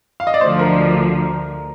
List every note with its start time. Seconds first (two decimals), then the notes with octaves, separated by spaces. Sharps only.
0.20 F5
0.27 D#5
0.34 D5
0.41 D2 D3 F3 C5
0.59 A#4